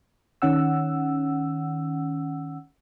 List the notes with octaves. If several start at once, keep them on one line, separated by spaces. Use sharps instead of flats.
D#3 C#4 F#5 E6